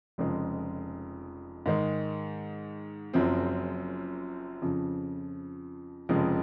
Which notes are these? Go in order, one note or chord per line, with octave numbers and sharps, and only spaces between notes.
F1 F2 C#3 F3 G#3
G#2 D#3 G#3
F#1 F#2 C#3 F3 C4
F2 C#3 F3
F1 F2 C#3 F3 G#3